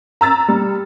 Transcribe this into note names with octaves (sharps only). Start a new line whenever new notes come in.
A#5 E6 A6
G3